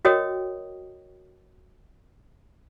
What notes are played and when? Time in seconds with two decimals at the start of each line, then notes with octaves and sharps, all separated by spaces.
0.05 F#4 A#4 C#5 D#5 G5 D#6